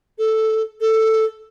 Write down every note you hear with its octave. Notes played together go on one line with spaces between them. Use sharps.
A4
A4